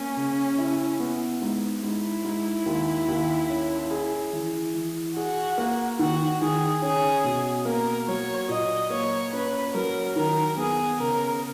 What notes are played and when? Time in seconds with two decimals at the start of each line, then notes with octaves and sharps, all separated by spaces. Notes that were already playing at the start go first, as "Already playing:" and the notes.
Already playing: A#3 C#4
0.17 C#3
0.58 E4
1.00 B3
1.41 G#2
1.83 G#2 E4
2.24 G#2
2.66 D#2
3.08 D#2
3.49 C#4
3.91 G#4
4.33 E3
4.74 E3
5.16 F#4 G#4
5.58 A#3
5.99 D#3 F#4
6.41 D#3 G#4
6.82 C#4 G#4
7.24 B2
7.65 A#3 A#4
8.08 F#3 C#5
8.49 A#2 D#5
8.90 A#3 C#5
9.33 C#4 B4
9.74 F#3 A#4
10.16 D#3 A#4
10.57 B3 G#4
10.99 C#3 A#4